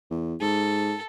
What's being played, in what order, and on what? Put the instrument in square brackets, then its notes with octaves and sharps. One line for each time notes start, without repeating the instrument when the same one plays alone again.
[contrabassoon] E2
[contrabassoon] G#2 [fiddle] A4